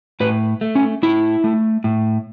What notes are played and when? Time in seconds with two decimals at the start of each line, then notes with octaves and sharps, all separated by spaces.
0.20 A2 B4
0.61 A3
0.75 C#4
1.03 A2 E4
1.44 A3
1.84 A2